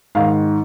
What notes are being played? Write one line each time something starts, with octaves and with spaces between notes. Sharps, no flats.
G#2 D#3 F5